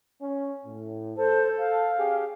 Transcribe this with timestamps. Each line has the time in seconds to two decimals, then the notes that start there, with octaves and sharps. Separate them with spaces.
0.21 C#4
0.65 A2
1.17 A4 C5
1.59 F5
1.97 C#4 G4 G#4